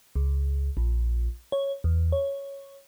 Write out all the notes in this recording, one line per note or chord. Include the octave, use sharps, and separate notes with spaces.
C#2
A#1
C#5
E2
C#5